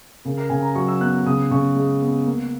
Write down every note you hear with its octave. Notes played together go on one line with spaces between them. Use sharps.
C#3 A#4
A#4
C#3 G#5
A#5
F#3 C#6
E6
B3 F#6
C#3 D#6
C#3 C#6
G#3
B3
A#3